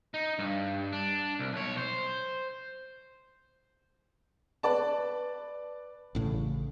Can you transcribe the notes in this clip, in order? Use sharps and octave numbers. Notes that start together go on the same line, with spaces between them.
D#4
G2
D4
C2
B1 C#5
C5
B4 D5 A5
A1 A2 C#3